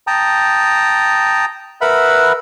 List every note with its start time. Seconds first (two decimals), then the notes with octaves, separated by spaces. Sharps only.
0.07 G5 A5 A#5 D#6
1.81 A#4 B4 E5 F#5 B5 E6